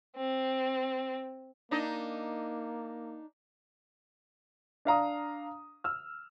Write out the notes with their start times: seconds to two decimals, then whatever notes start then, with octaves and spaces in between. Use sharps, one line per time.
0.16 C4
1.71 A#3 D4 D#4 D#5
4.85 D4 F5 A#5 D#6
5.84 E6 F6